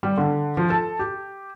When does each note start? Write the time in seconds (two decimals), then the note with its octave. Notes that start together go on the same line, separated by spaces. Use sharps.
0.03 G3
0.17 D3
0.57 F3
0.70 A4
0.99 G4